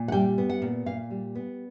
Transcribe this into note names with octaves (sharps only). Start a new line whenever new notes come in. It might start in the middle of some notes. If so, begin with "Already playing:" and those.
Already playing: A#2
F#5
G3 G5
B3
F#5
A#2
A#2 F5
G3
B3